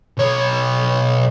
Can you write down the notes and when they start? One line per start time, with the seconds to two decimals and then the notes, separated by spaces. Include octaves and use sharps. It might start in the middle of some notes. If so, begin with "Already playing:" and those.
0.18 B1 C#5